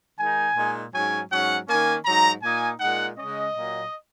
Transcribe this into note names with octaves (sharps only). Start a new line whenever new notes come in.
D#3 G#3 D#4 G#5
A#2 G#3 D#4
G#2 F#3 C#4 G#5
G#2 F#3 C#4 F#5
D#3 A#3 C#4 G#5
G#2 F#3 D#4 A#5
A#2 A#3 D#4 G#5
A#2 G#3 D#4 F#5
C#3 G#3 C#4 D#5
A#2 F#3 A#3